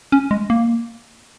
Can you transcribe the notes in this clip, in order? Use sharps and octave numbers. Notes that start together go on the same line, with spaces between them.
C#4
G#3
A#3